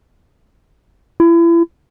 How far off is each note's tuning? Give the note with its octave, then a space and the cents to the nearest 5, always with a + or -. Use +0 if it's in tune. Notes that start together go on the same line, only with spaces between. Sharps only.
E4 +35